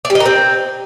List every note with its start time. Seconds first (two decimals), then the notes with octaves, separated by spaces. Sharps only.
0.05 D5
0.10 G4
0.15 D#5
0.20 A#4
0.26 C4